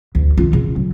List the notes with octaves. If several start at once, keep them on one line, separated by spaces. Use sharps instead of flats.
D2
D#3 F4
C#3
F#3